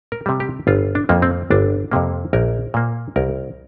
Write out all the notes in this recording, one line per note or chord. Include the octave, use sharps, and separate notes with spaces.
A#4
C3 G3
G4
G1 F4
D4
F2 F3 A#3
C4
G1 D4
F2 C3 A#3
A#1 A#4
A#2 A#3
C2 A#4